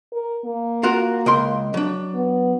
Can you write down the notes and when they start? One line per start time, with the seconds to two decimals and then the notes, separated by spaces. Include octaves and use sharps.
0.13 A#4
0.45 A#3
0.83 F4 F#4 A#4
1.26 C#2 A#4 C6
1.74 F#3 D4
2.14 B3